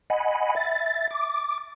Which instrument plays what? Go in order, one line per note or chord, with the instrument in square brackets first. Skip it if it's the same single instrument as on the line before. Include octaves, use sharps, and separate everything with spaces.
[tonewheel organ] D#5 F#5 G#5 B5
E5 A6
D6